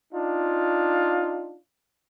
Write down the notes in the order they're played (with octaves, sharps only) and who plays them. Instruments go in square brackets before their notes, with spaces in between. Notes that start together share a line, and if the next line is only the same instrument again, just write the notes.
[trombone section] D4 D#4 F4